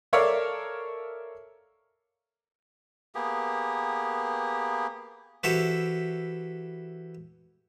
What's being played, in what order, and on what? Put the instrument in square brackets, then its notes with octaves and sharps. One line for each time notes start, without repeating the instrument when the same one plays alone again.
[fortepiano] A4 A#4 C#5 D5 E5 F5
[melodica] A#3 B3 G4 G#4
[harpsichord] E3 F#4 G4 A4 C5 E5